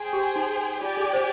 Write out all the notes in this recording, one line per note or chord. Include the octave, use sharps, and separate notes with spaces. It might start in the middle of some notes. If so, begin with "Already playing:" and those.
Already playing: G#4 C5 G5
G4
D#4
F4 G4 D5 G#5
G#4
C5